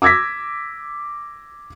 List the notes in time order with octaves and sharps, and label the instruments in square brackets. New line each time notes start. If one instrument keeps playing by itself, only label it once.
[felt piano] D6 E6 G#6 A#6 B6